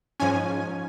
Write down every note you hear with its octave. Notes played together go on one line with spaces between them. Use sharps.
G#2 F3 C#4 G#5